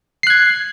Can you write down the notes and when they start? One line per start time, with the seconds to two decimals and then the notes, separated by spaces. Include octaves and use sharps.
0.23 C7
0.27 F#6
0.30 G#6